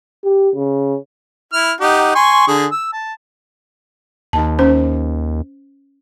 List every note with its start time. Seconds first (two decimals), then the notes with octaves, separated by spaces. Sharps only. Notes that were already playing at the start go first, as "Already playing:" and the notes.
0.24 G4
0.55 C#3
1.53 E4 F6
1.81 D#4 G4 F#5
2.15 G#5 C6 C#6
2.48 D3 G#4
2.72 E6
2.93 A5
4.33 D#2 A5
4.59 C#4 C5